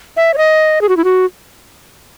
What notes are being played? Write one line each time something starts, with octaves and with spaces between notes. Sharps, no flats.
E5
C#5
D#5
G#4
F#4
E4
F#4